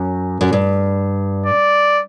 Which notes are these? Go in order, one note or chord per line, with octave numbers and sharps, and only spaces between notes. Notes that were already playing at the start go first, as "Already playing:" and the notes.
Already playing: F#2
F#2
G2
D5